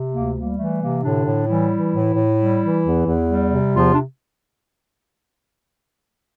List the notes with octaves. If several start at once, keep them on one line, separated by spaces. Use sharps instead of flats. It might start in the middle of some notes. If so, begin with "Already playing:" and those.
Already playing: C3
D2 A#3
G3 A#3
E3 A3
C3 A#3
A2 D3 D4
A2
E3 G3 E4
E3
A2
A2
G3
E3
E2
E2
G3
C3
E2 F3 F4
D4